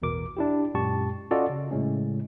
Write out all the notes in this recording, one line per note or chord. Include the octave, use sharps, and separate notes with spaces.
A1 E2 B2 A#4 D6
D4 E4 G4
F#2 A#2 G#3 G4 A5 C#6
C#4 F4 F#4 A4 D5 D#5
C#3
A2 C#3 G#3 C#4